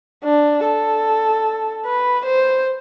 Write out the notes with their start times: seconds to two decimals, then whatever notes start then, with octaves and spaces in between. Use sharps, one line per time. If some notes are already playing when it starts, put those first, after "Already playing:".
0.24 D4
0.64 A4
1.85 B4
2.25 C5